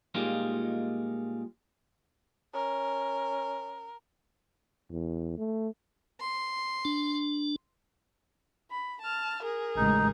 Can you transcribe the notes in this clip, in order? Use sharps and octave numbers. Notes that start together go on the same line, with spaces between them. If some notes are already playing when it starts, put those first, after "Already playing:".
A#2 G3 G#3 A#3 D#4 F4
C#4 A#4
E2
A3
C6
D4
B5
A5 F6
G#4 A#4
A1 C#3 G#3 D#4